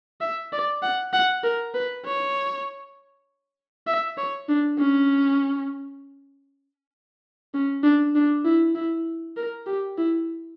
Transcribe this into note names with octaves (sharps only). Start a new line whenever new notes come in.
E5
D5
F#5
F#5
A#4
B4
C#5
E5
C#5
D4
C#4
C#4
D4
D4
E4
E4
A#4
G4
E4